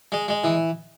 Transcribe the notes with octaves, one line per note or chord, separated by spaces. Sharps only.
G#3
G#3
E3